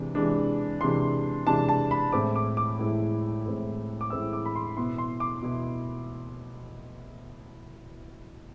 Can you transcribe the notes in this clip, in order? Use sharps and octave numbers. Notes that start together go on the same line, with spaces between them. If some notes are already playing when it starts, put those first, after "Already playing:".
Already playing: C3 E3 G#3 D4
C3 E3 G#3 D4
C3 E3 G#3 D4 C6
C3 E3 G#3 D4 A5
A5
B5
A2 G#3 C4 E4 D6
D6
D6
A2 G#3 C4 E4
A2 G#3 C4 E4
D6
A2 G#3 C4 E4 E6
D6
B5
C6
B2 B3 E4 C6
C6
D6
B2 B3 E4